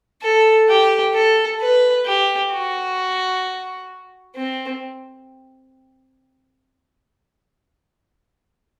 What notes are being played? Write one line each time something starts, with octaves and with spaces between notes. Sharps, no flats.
A4
G4
A4
B4
G4
F#4
C4